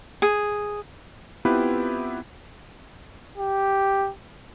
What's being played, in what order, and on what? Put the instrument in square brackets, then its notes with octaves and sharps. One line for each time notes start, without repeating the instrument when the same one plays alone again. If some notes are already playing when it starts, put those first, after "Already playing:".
[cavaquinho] G#4
[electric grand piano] B3 C4 E4 F4 G4 B4
[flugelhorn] G4